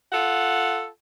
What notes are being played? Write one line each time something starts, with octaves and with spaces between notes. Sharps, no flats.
F4 A4 F#5